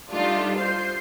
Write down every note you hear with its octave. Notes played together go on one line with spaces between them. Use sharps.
G3 A3 D4 D#4 F4
F4 C5 G6 C7